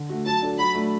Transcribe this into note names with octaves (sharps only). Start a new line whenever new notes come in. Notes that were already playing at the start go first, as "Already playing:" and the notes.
Already playing: D3
A3 F#4
F#3 A5
D4 A4
F#3 B5
A3 D4